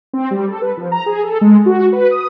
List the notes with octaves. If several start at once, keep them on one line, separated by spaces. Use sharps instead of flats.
C4
G3
A4
B4
F3
A#5
G#4
A4
G#3
F#4
B4
D#6